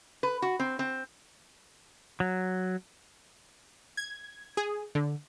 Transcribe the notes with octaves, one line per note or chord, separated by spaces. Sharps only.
B4
F#4
C4
C4
F#3
G#6
G#4
D3